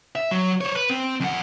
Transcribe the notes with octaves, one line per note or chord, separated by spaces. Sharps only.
E5
F#3
C5 C#5
B4
C4
F2 F#5